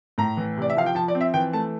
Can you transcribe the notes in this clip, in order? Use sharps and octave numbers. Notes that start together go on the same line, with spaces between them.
A2 A#5
E3
C3 D5
E5
F3 F5
G5
F3 A5
D5
C4
E5
E3 G5
A3 A5